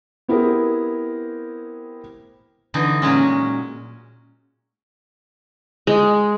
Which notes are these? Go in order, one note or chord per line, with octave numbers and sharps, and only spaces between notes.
B3 C4 E4 G4 G#4 A#4
D3 E3 D#4
A#2 F#3 G#3 C#4
G#3